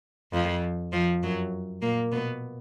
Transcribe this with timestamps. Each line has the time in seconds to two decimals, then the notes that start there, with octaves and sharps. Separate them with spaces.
0.33 F2 F3
0.92 F2 F3
1.23 F#2 F#3
1.82 A#2 A#3
2.12 B2 B3